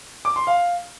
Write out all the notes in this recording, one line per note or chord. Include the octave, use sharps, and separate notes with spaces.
D6
C6
F5